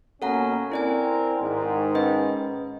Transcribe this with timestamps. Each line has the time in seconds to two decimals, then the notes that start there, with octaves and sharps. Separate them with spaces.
0.22 B2 A#3 C#4 A4 F#5 A#5
0.72 C4 E4 A#4 D5 G#5
1.40 G#2 D#3
1.95 C#4 B4 D#5